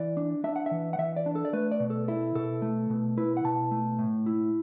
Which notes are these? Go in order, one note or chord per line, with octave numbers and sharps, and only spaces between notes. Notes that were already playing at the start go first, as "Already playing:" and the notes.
Already playing: E3 D5
D4
D4 E5
F#5
E5
E3
F#5
E3 E5
D5
D4
A4
D5
A3 B4
D5
B2
A4
E4 A4
B2 A4
A3
B2
E4 B4
F#5
B2 A5
A3
A2
E4